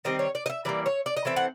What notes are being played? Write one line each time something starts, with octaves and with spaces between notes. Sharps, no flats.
D#3 G3 C4 D#5
C#5
D5
D#5
E5
E3 G3 A#3 D5
C#5
D5
D#5
E3 A3 C4 E5
F#5